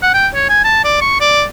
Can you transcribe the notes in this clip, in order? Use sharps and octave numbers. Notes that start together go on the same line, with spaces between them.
F#5
G5
C#5
G#5
A5
D5
C#6
D5